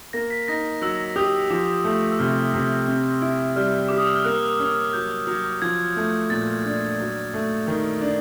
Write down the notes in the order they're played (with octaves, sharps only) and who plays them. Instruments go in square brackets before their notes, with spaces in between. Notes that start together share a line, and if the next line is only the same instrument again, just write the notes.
[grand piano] A#3 [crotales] A#6
[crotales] B6
[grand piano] D#4 [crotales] A#6
[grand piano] F#3 [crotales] E6
[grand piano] G4 [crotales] D#6
[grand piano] F3 [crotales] D6
[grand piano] A3
[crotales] E6
[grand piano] C3 [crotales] F6
[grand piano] C3
C4
E4
[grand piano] G3 [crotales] F6
[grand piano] G4 [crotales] D6
[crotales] D#6
E6
F6
[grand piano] A#3 [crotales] F#6
[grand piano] C#4
[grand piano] F#3 [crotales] G6
[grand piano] F#3
[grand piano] F3 [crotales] G#6
[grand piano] A3
[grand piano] A#2 [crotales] A6
[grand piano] D4
F#3
A3
D#3
D4